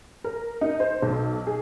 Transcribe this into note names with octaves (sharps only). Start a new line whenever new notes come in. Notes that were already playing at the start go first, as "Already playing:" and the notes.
A#4
D#4
C5
B1
G#4